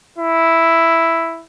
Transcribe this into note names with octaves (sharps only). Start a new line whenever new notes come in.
E4